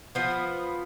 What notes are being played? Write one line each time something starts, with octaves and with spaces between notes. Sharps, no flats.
F3 B3